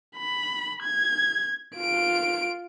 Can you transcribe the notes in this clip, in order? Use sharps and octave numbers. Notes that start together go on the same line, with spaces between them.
B5
G#6
F4 D7